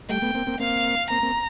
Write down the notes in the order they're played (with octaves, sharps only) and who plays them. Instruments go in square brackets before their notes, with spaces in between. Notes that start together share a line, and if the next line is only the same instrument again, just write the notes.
[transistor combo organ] G3 A3 [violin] G5
[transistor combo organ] A3 B3
A#3 C4
A#3 C4
[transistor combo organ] A#3 C4 [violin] F5
[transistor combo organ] A#3 C4 [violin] A#5
[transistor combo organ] A#3 C4